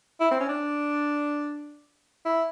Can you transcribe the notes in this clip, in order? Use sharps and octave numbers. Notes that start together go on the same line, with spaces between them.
E4
C4
C#4
D4
E4